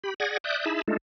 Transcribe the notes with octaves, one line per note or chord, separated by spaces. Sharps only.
G4 B5
G#4 D5 F#5 G#6 A#6
D5 E5 D#6 F#6 G6
D#4 E4 G#4 E5 A5 B5
G#3 A3 D4 D#4 F4 A4